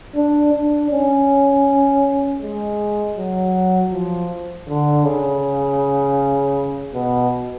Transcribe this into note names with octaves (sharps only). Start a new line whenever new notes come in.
D4
D4
C#4
G#3
F#3
F3
D3
C#3
B2